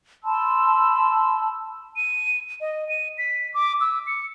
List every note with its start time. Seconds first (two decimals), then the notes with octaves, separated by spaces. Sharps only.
0.24 A5 B5 C6 E6
1.96 D#7
2.61 D#5
2.89 D#7
3.18 B6
3.54 D6
3.81 E6
4.07 C#7